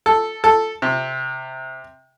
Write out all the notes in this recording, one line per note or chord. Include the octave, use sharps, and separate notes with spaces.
A4
A4
C3